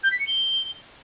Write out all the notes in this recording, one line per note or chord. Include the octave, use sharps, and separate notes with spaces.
G6
B6
C#7
G7